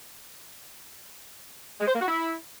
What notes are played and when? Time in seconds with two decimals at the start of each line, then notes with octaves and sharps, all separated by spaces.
1.80 G#3
1.87 C5
1.94 A#3
2.01 F#4
2.08 E4